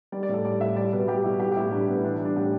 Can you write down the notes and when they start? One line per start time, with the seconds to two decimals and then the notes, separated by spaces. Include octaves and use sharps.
0.12 G3 D5
0.23 D5
0.29 A2 A4
0.45 G3 D5
0.60 A2 E5
0.76 G3 D5
0.93 B2 B4
1.08 G3 G4
1.24 B2 E4
1.40 G3 G4
1.52 G4
1.56 A2 E4
1.72 G3 D4
1.88 A2 B3
1.98 E4
2.04 E3 D4
2.20 G3 D4
2.37 A2 G4